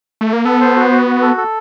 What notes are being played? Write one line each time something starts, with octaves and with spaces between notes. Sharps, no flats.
A3
A#3
B3 A4
C5
F#4
F#4
F#4
A4
A4